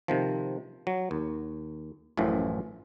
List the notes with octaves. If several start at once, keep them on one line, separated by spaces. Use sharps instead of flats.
C3 D#3 F3
F#3
D#2
A1 F#2 A2 E3 F3